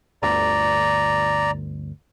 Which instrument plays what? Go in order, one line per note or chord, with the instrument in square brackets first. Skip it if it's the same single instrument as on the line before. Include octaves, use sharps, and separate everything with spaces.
[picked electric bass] G1 D2 [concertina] D5 A#5